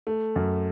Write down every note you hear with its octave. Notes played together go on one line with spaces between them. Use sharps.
A3
F#2